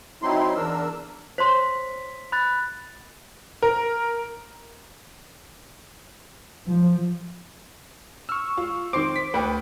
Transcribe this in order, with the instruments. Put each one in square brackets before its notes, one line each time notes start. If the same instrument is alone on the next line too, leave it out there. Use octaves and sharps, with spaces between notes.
[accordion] F#3 C4 D#4 E4 C6
E2 D4 A#4 E6
[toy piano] C5 C#5 C6 [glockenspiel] B6
[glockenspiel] B5 F#6 A6
[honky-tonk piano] A#4
[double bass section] F3
[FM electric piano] C#6 E6 [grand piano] F6
[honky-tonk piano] F4
[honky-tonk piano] D#3 C5 [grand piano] C4 C6 C7 [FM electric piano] D6
[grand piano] B6
[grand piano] D2 [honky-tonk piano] B4 G5